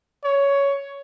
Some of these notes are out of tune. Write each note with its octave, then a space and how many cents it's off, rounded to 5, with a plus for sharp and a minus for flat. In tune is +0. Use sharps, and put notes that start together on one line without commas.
C#5 +10